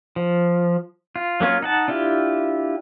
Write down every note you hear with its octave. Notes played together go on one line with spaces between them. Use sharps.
F3
F4
F#3 A#3 C#4 F4
D#4 F#5 A5
D4 E4 F4 G4